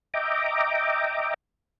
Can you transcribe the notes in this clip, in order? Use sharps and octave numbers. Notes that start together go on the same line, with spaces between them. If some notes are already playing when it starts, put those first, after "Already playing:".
D#5 E5 G5 A#5 D6